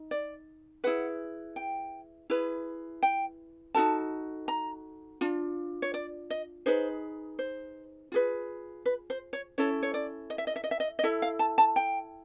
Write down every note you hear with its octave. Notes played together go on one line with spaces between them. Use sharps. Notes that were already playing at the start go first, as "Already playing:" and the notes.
Already playing: D#4
D5
E4 G#4 B4 F#5
G5
E4 G#4 B4
G5
D#4 F#4 A4 A5
A#5
D4 F4
C#5
D5
D#5
D#4 G#4 B4 C5
C5
F4 G#4 B4
B4
C5
C#5
C#4 E4 A4 C#5
C#5
D5
D#5
E5
D#5
E5
D#5
E5
D#5
D#5
E4 A4 E5
F5
A5
A5
G5